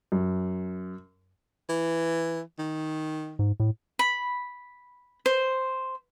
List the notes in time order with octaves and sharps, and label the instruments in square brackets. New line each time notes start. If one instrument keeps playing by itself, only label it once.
[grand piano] F#2
[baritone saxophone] E3
D#3
[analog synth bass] G#2
A2
[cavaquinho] B5
C5